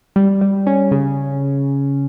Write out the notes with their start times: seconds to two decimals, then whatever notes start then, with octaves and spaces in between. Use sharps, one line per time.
0.16 G3
0.41 G3
0.67 C#4
0.91 C#3